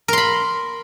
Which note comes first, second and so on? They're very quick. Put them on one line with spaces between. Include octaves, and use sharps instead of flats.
A#4 C6 B5